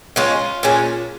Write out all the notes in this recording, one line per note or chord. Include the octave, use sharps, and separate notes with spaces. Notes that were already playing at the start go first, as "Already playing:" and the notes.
C#3 G#3 C#4 F4
A#2 G#3 C#4